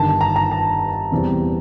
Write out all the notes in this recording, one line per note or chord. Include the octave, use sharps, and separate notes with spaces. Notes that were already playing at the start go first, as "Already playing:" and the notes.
Already playing: G1 G2 D#3 A5
A#5
A#5
A5
E2 C3 E3 G3 C4